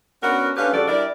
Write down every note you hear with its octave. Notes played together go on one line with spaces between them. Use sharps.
B3 C#4 D4 F#4 A#4
A3 C#4 D4 G4 B4 F5
C#3 F3 G3 F#4 A4 D5
G3 D4 E4 A#4 D5